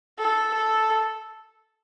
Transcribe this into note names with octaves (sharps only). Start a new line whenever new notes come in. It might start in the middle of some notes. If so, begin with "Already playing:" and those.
A4
A4